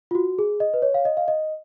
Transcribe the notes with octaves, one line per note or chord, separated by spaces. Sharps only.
F4
F#4
G#4
D#5
B4
C#5
F5
D#5
F5
D#5